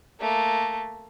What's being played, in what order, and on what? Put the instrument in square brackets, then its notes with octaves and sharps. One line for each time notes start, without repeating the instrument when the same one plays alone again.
[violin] A3 A#3